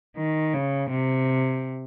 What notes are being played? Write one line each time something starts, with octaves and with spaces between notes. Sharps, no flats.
D#3
C#3
C3